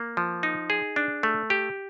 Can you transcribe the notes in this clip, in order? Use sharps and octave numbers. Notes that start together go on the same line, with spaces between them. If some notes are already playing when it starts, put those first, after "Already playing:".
Already playing: A#3
F3
D#4
G#4
D4
A3
G4